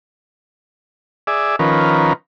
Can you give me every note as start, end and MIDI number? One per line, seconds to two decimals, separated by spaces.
1.27 1.56 68
1.27 1.56 74
1.27 1.56 76
1.59 2.13 51
1.59 2.13 53
1.59 2.13 61
1.59 2.13 70
1.59 2.13 71